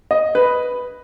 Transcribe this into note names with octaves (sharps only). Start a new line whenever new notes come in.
D#5
B4